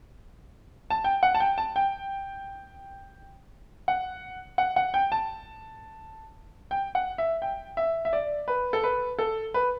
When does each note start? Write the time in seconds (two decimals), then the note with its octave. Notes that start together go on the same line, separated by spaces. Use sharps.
0.90 A5
1.04 G5
1.23 F#5
1.35 A5
1.40 G5
1.58 A5
1.76 G5
3.88 F#5
4.58 F#5
4.76 F#5
4.94 G5
5.12 A5
6.71 G5
6.95 F#5
7.18 E5
7.42 G5
7.77 E5
8.05 E5
8.13 D5
8.48 B4
8.73 A4
8.84 B4
9.19 A4
9.54 B4